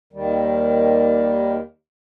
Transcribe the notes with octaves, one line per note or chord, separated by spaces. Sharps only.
D#2 D#3 G3